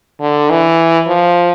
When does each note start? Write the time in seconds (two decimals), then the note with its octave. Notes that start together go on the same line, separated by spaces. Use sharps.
0.21 D3
0.50 E3
1.08 F3